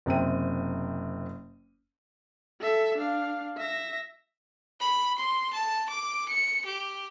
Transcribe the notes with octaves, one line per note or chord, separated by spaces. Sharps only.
F#1 C3 C4 G5 D#7
A4 E5
D4 F5
E5 A#6
B5
C6
A5
D6
C#7
G4